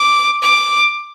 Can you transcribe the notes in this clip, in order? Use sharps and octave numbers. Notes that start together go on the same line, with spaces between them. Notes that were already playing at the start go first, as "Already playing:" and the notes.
Already playing: D6
D6